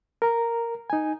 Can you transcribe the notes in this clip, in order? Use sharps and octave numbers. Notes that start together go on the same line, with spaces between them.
A#4 A#5
D#4 G#5